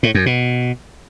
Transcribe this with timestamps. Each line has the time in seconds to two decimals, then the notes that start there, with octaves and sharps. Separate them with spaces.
0.03 A2
0.15 F#2
0.26 B2